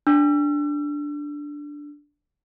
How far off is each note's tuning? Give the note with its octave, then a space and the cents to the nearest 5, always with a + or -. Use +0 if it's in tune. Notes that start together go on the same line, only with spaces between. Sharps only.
D4 -5 E6 +40